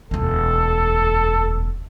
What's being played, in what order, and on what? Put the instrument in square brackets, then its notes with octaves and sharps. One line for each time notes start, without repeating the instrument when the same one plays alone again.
[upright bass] E1 D2 [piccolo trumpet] A4